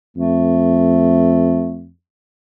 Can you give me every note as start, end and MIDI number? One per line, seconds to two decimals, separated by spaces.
0.17 1.90 41
0.17 1.86 57